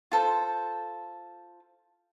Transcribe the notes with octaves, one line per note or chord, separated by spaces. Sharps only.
F4 A4 C5